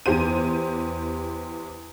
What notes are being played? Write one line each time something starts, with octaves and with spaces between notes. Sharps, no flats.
E2 G4 C5 D#7